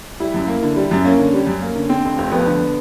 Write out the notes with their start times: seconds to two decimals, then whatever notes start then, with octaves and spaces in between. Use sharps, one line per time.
0.20 G3 E4
0.34 F#2
0.47 A#3
0.63 D3
0.76 G3
0.91 F#2
1.05 A#3 C#4
1.19 D3
1.33 G3
1.47 F#2
1.62 A#3
1.75 D3
1.89 D3 C4
2.05 F1
2.18 F1
2.32 F2 B3
2.46 D3